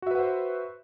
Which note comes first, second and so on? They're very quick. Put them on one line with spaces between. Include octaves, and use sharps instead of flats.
F#4 E5 B4 F#5 C5